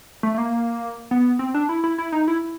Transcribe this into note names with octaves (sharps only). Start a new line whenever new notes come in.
A3
A3
A#3
B3
C4
D4
E4
E4
E4
D#4
E4